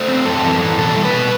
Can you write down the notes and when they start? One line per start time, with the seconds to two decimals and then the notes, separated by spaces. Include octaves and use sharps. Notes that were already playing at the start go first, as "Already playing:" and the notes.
Already playing: A3 C5
0.08 C4
0.25 F#2 A4
0.44 E3
0.61 E3
0.78 B2 A4
0.96 G3
1.05 B4
1.13 B2